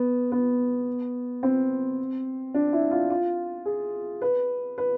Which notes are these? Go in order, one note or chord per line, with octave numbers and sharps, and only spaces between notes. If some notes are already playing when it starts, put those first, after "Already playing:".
Already playing: B3
B3
C4
D4
E4
F4
F4
G#4
B4
B4